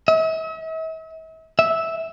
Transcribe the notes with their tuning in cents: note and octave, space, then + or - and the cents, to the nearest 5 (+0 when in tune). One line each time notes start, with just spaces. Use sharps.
E5 -45
E5 -10